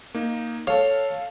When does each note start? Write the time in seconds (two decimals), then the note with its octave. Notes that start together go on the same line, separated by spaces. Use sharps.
0.15 A#3 D#4
0.67 A4 C#5 F5